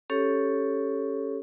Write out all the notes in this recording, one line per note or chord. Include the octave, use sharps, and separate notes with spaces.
C#4 G4 A4 C#5